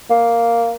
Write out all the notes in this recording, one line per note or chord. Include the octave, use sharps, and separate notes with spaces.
A#3